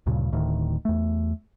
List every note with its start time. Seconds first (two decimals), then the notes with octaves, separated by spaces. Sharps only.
0.06 D2 G2 A#2 C#3
0.32 D1 D2 A2 D#3
0.85 E2 A3